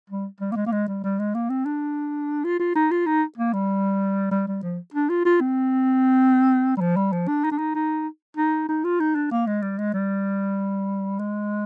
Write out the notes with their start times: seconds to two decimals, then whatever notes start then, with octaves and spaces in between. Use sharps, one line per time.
0.10 G3
0.41 G3
0.52 A#3
0.56 G#3
0.66 A#3
0.72 G#3
0.88 G3
1.04 G3
1.19 G#3
1.35 A#3
1.50 C4
1.65 D4
2.45 F4
2.60 F4
2.76 D#4
2.91 F4
3.06 D#4
3.38 A#3
3.53 G3
4.31 G3
4.47 G3
4.63 F3
4.94 D4
5.09 F4
5.25 F4
5.41 C4
6.77 G3
6.81 F3
6.96 G3
7.12 F3
7.28 D4
7.44 D#4
7.52 D4
7.58 D#4
7.75 D#4
8.37 D#4
8.69 D#4
8.84 F4
9.00 D#4
9.15 D4
9.31 A#3
9.47 G#3
9.62 G3
9.78 G#3
9.94 G3
11.19 G#3